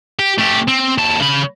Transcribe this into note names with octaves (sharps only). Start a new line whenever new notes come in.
G4
A3 G4
C4
D#2 A5
C#3 B5